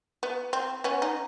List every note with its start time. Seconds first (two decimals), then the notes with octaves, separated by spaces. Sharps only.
0.23 B3
0.53 C4
0.84 B3 C#4
1.02 D#4